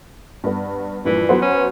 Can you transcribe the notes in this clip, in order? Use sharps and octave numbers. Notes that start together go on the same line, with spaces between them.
G2 B3
G2 A#2 E3 F3
F#3 B3 C5
C#4